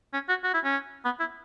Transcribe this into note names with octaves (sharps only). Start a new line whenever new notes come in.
C#4
F#4
F#4
E4
C#4
B3
E4